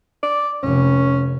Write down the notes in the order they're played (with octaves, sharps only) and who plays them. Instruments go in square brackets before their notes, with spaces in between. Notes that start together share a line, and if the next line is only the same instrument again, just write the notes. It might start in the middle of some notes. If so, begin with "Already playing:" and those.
[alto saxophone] D5
[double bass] F1 [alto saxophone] C#4